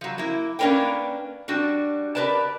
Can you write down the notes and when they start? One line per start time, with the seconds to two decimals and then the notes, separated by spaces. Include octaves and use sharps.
0.01 F3 F#3
0.18 A#3 E4
0.59 A#3 C#4 D4 A#4 B4 G5
1.48 G3 D4 F#4
2.15 G4 A#4 B4 D5 A5